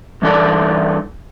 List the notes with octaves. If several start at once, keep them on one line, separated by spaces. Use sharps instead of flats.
G2 E3 D4 A4 D5